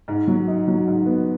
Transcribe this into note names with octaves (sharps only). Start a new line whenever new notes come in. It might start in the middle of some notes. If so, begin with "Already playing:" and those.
G#2
F#3
D#4
F#3
G#2
B3